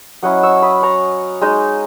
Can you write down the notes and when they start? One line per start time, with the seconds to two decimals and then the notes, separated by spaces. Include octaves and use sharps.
0.23 F#3 C#4 E4 D#5 F#5
0.43 C#6 E6
0.62 B5 D#6
0.82 A#5 C#6
1.41 G#3 D#4